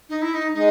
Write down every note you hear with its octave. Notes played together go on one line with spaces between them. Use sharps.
D#4
E4
D#4
G#3 D#4